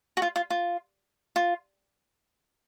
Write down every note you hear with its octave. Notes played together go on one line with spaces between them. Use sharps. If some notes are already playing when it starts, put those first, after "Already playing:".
F#4
F4
F4
F4
F4